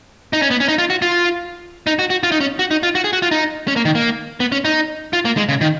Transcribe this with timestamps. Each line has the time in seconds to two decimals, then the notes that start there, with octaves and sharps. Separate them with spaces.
0.33 D#4
0.42 C#4
0.51 B3
0.60 C#4
0.68 D#4
0.78 F4
0.90 F#4
1.02 F4
1.87 D#4
1.99 F#4
2.10 F#4
2.23 F4
2.32 D#4
2.40 C#4
2.59 F#4
2.71 D#4
2.83 F4
2.95 F#4
3.04 G#4
3.13 F#4
3.22 F4
3.31 D#4
3.68 C#4
3.76 A#3
3.85 D#3
3.95 A#3
4.40 B3
4.52 C#4
4.65 D#4
5.13 F4
5.25 A#3
5.37 G#3
5.49 C#3
5.61 D#3